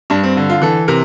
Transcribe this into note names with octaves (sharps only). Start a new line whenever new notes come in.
G2 D4
C4
D3
F4
E3 A4
C3 A#4